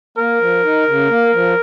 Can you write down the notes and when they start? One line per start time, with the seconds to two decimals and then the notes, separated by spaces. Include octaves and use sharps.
0.18 A#3 A#4
0.41 F3
0.64 D#4
0.87 C#3
1.10 A#3
1.33 F3